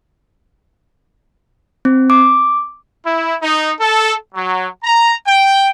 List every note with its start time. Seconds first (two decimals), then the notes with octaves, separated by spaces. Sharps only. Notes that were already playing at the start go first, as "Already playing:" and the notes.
1.85 C4
2.10 D6
3.04 E4
3.41 D#4
3.80 A4
4.34 F#3
4.84 A#5
5.26 G5